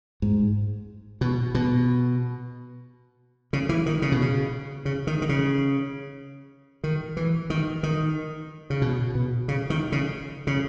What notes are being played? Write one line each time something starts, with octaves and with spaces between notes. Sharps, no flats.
G#2
B2
B2
C#3
E3
D#3
C#3
B2
C#3
C#3
D#3
D#3
C#3
D#3
E3
D#3
D#3
C#3
B2
B2
C#3
D#3
C#3
C#3